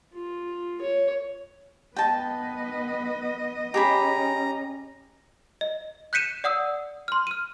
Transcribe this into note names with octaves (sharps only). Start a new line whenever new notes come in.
F4
C#5
B3 B4 D#5 G5 A5
C#4 G4 G#4 A#5 B5
D#5
F#6 G6 B6 C#7 D#7 E7
D5 F#5 D#6 E6
C6 F6
F6 D#7